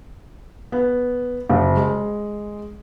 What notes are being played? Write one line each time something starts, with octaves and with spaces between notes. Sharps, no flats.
B3
F#1
G#3